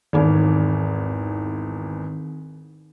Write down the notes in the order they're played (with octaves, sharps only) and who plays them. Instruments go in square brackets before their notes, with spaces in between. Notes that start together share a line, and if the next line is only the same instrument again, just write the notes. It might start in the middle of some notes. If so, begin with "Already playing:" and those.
[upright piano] G#1 E2 [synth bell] D#3 C4 D#4